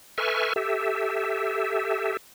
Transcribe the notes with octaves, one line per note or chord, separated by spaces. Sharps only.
A4 B4 E5 G#5 C#6 F6
G4 A4 E5